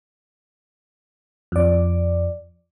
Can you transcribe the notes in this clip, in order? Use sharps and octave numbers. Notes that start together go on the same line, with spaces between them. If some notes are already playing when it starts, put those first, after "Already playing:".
F2 D5